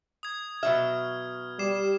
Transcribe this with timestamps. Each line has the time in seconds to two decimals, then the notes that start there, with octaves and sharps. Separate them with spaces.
0.23 D#6 G#6
0.63 B2 F#3 E5 F6
1.59 G3 D6 C7 E7